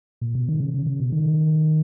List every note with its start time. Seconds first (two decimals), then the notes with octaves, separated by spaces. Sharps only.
0.21 A#2
0.35 B2
0.49 D#3
0.60 C#3
0.74 C#3
0.86 C#3
1.00 B2
1.12 D#3